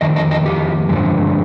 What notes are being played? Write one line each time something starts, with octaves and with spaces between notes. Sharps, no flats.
F2 D#3 D#5
D#5
D#5
G4
G2 D3 F3 G#3